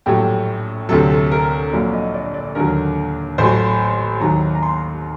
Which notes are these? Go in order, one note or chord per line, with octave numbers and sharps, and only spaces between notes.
A#1 A2 F#3 G4
D2 C3 F#3 A4
A4
A#4
A#1 A#2 F#3
D#5
D5
D5
D#2 D3 F#3 A#4
A1 A2 F#3 C5
D#2 D#3 F#3 A#5
A#5
C6